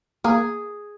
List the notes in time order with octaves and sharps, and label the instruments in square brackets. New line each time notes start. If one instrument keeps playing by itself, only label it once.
[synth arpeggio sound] A#3 [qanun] G#4